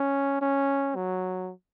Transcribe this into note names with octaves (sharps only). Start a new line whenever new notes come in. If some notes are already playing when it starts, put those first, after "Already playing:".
Already playing: C#4
C#4
F#3